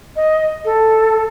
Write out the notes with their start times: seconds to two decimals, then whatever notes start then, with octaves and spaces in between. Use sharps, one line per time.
0.16 D#5
0.65 A4